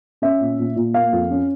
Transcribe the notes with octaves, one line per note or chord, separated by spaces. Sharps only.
C#4 E5
A#2
A#2
A#2
A#3 F5
F2
C#4